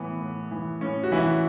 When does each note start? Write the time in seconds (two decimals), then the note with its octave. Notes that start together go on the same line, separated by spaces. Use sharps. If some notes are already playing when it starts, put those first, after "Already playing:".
Already playing: A2 E3 B3
0.21 A2
0.51 E3
0.81 A2 C#4
1.03 F#4
1.12 E3 E4